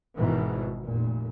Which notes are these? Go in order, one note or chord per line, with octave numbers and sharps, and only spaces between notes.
G#1 G#2 B2 D#3 E3
F1 A#2